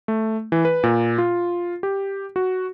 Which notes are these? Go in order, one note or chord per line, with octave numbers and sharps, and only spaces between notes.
A3
E3
B4
A#2
F4
G4
F#4